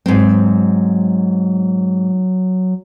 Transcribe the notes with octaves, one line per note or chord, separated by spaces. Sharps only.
G#2 F#3 C4